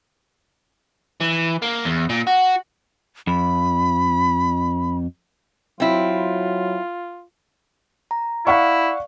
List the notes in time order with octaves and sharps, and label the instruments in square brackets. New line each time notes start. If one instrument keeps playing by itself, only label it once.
[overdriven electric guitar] E3
A#3
E2
A#2
F#4
[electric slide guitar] F2 [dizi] B5
[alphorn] F#3 [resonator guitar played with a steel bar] C4 E4 [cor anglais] F4
[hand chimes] A#5
[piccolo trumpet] E4 [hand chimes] D5 [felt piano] F5 F#5 C#6